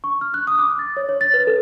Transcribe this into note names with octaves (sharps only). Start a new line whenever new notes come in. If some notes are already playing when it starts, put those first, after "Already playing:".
C#6
F6
F#6
D#6
D6
A6
C#5
C#5
A6
B4
A4